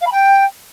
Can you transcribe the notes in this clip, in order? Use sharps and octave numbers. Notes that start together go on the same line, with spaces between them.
F5
B5
G5